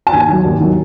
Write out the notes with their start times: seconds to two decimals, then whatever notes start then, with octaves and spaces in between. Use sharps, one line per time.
0.07 A5
0.12 D#2 G#5
0.28 D#3 F#3
0.45 D#2
0.60 D#3 F#3